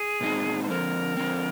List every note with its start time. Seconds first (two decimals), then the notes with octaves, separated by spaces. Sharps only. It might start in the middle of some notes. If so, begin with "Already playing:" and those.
Already playing: G#4
0.21 A#2 G#3 C4 D#4
0.63 C5
0.69 D3 F3 C4 A#4
1.17 D3 F3 C4